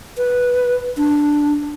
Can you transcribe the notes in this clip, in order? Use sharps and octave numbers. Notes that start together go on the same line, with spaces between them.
B4
D4